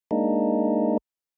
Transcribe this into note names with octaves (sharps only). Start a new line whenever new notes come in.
G#3 A#3 D4 D#4